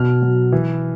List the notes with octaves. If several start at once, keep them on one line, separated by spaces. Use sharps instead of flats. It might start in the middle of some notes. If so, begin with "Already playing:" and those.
Already playing: B2 F6
F#3
E3